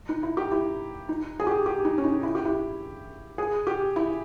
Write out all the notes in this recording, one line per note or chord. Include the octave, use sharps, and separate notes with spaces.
D#4
E4
G4
E4
D#4
G#4
G4
G4
D#4
C#4
D#4
E4
G4
E4
G#4
G4
E4